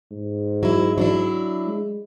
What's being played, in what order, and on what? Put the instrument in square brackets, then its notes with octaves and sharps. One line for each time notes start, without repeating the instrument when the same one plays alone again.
[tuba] G#2
[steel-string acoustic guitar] F#3 E4
F#3 D4 E4
[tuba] G#3